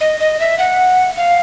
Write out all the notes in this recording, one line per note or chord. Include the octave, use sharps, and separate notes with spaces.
D#5
D#5
E5
F#5
F5